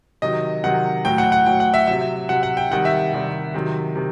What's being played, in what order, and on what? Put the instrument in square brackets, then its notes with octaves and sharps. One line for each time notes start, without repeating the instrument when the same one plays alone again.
[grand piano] C3 D#3 F#3 D#5
C3 D#3 F#3 F#5
A2 F#3 G5
F#5
F#5
A2 F#3 G5
F#5
E5
C3 F#3 E5
C3 F#3 F#5
F#5
G5
C3 D#3 G3 F#5
E5
C3 D#3 G3
C3 D#3 F#3
C3 D#3